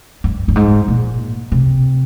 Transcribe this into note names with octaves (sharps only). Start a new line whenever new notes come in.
G2
G2
G#2
A#2
C3